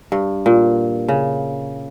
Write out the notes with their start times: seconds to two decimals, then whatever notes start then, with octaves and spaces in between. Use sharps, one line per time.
0.12 G2
0.46 A#2
1.08 C#3